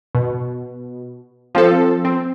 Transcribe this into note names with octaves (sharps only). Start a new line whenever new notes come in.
B2
F3 C4 A4
C4